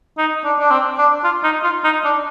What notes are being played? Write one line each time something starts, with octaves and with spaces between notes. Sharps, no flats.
D#4
D4
D4
C4
D4
F4
D#4
F4
D#4
D4